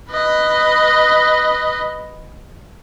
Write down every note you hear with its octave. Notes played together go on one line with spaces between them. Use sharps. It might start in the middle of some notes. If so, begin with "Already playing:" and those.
B4 D#5